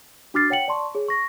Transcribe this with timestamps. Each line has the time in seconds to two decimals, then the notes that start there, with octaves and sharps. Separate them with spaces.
0.34 D4 F#4 D6 F6 A6 C7
0.50 C#5 F#5 G5 C#7 F#7
0.68 D5 A5 C6 C#6
0.95 G#4 C#5
1.09 C#6 A#6